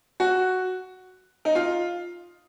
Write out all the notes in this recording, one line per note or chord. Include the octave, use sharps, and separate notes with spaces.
F#4
D#4
F4